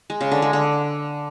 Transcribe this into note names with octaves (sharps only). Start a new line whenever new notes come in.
G#3
C#3
D3
G#3
D3